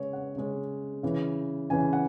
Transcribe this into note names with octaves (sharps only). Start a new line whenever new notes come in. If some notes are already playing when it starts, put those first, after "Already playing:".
Already playing: C#3 G#3 C#4 C#5
F#5
C#3 G#3 C#4
C#3 E3 C#4
C#3 E3 C#4 G#5
F#5